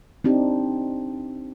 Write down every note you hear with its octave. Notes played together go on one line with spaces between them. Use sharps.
C4 D4 D#4 G4